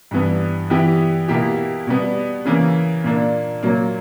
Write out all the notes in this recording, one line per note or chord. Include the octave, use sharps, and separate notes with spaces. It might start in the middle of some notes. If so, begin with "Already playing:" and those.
G2 E3 B3
E3 B3 E4 G4
B2 A#3 E4 G4
B2 G3 B3
C#3 E3 A#3
A#2 A#3 D4
A#2 F#3 A#3